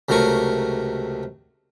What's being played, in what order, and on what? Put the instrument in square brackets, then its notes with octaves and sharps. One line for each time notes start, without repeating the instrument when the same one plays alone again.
[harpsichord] C#2 C3 F#3 A3 A#4 C#6